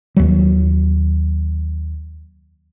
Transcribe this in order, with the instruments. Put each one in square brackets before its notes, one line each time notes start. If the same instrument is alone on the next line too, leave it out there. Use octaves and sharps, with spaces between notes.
[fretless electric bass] D#2 F#3